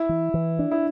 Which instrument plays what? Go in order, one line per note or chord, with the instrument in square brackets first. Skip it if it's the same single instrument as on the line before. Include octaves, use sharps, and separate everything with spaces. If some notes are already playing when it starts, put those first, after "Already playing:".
Already playing: [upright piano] E4
[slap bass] E3
E3
D4
[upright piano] E4